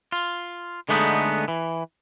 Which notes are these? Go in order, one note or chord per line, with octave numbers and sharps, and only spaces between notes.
F4
D3 G#3 A3 B3 D#4
E3